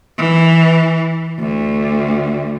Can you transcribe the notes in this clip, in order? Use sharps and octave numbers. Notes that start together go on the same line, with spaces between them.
E3
D2